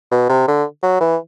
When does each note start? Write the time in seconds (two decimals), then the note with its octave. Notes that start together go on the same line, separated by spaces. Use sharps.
0.11 B2
0.29 C3
0.48 D3
0.82 F#3
1.00 E3